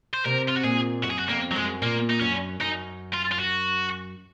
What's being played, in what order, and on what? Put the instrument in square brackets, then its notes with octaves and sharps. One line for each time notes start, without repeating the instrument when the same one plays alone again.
[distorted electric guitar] C5
[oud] C3 [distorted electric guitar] A#4
[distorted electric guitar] F4
F#4
[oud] A#2 [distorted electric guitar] G#4
[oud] F#2 [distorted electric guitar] F#4
[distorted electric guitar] G#4
F#4
[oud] F2 [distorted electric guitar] A#3
[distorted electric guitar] F#3
[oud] F#2 [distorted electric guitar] G#3
[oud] A#2 [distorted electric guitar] A#3
[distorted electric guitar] D#4
[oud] F#2 [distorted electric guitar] C#4
[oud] F#2 [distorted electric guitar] D#4
[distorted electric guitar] F4
F4
F#4